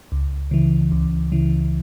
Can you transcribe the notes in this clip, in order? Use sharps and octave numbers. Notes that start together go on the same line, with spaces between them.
C#2
C#3 E3
C#2
C#3 E3